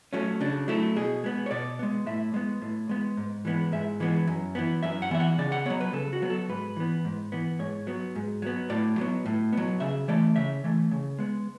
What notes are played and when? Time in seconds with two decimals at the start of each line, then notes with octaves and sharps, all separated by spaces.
0.13 F#3 A3 C#4
0.41 C#3 D4
0.68 F#3 A3 E4
0.96 B2 G#4
1.24 G#3 B3
1.46 C#5
1.51 B2 D5
1.79 G#3 B3
2.06 A2 E5
2.34 G#3 B3
2.62 A2
2.89 G#3 B3
3.17 G#2
3.45 E3 G#3 B3
3.72 G#2 E5
4.00 E3 G#3 B3
4.27 F#2
4.55 E3 B3
4.83 F#2 E5
5.02 F#5
5.11 E3 B3 E5
5.20 F#5
5.38 C#3 D5
5.52 F#5
5.66 F#3 B3 C#5
5.81 B4
5.93 C#3 A4
6.13 F#4
6.22 F#3 B3
6.30 A4
6.49 G#2 B4
6.77 E3 B3
7.05 G#2
7.32 E3 B3
7.59 G#2 C#5
7.87 F#3 B3
8.15 G#2
8.42 F#3 B3
8.70 A2 D5
8.98 F#3 B3
9.26 A2
9.53 F#3 B3
9.80 C#3 E5
10.08 E3 A3 D5
10.36 C#3 E5
10.64 E3 A3
10.91 C#3
11.19 G#3 B3